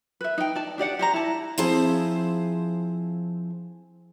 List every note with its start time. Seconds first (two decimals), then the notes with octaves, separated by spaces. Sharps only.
0.21 B4 E5
0.38 D#4 G5
0.55 D5 A5
0.78 D4 G4 D5 F#5
0.99 G4 C5 A#5
1.14 E4 A5
1.58 F3 C4 E4 G#4 C5 A5